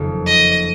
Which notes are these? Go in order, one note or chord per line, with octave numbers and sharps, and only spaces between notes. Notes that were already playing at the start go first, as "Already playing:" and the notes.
Already playing: F#1 F2 D#3 A#3 D#4
D#5